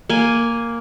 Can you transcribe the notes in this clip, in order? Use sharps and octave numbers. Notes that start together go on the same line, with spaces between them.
A#3 G#5